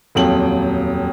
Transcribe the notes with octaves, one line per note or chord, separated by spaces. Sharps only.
D#1 F2 F#3 G5 F#7